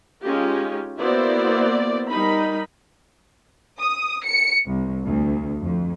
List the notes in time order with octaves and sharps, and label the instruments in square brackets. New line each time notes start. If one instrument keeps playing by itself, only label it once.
[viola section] G#3 C#4 D#4 F4 G4
A#3 B3 E4 F#4 C5 D5
G3 D#4 A#4 B5
[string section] D#6
C#7
C2
D2
F2